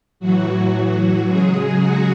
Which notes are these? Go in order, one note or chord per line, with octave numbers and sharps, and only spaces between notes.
A2 E3 F#3 F#4
F#3 F#4
C#3 F#3 G#3 G#4
F#3 F#4